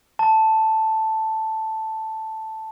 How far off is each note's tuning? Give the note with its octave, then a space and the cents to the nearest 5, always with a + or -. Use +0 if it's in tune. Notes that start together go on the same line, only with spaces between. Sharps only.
A5 +0